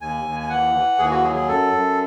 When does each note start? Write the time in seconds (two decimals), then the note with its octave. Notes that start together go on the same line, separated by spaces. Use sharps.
0.01 D#2 G#5
0.25 D#2
0.40 G#5
0.49 E3 F#5
0.75 E3
0.99 D#2 G#4
1.10 F#4
1.23 F#3 G#4
1.35 G#4
1.48 F#2 A4
1.73 F#2